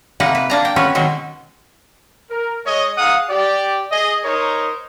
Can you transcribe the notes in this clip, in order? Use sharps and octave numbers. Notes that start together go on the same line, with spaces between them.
C3 A#3 D#4 B4 F#5
B4
A#3 D4 A#5
G5
C4 C#4 F#4 B4 C#5
B2 D#3 F#3 G#3
A#4
G#3 C#5 D#5
D#4 G#4 F5 F#5 D#6
G4 D5
G#4 D#5
D#4 A#4 C5 C#5 D#6